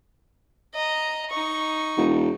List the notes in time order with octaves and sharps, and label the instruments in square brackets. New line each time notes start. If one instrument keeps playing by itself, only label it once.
[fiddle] D#5 A#5
D#4 C#6
[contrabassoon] E1